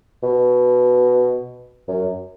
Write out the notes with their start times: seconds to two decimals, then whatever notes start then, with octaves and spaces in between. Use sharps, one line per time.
0.23 B2
1.88 F#2